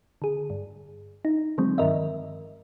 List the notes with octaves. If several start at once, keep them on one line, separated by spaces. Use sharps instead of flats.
D3 G#4
G2
D#4
D3 F3 F#3 G#3 C4
G2 D#3 A#4 D#5 E5